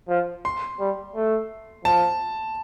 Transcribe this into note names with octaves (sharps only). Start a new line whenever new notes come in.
F3
C6
G3
A3
F3 A5